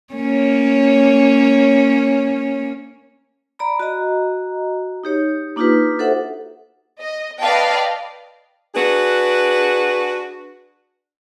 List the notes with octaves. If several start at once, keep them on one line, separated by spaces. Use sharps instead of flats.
A#3 C#4 C#5
D5 A#5 B5
F#4 D#5 A#5
D#4 G4 C#5
A#3 D4 D#4 F4 G4 B4
F#4 A4 C5 E5 F#5
D#5
B4 D5 D#5 F5 G5 A5
D4 F#4 G#4 B4